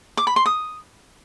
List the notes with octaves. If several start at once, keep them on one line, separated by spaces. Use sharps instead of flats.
D6
B5
C6
D#6